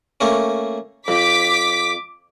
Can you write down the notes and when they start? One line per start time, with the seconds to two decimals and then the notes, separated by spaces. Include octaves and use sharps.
0.21 A3 A#3 C#4
1.08 F2 D6 B6